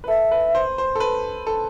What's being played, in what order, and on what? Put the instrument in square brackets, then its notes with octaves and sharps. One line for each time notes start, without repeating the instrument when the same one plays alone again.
[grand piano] B4
[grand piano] A4 [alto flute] E5
[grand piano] B4
C5
C5
A4
B4
A4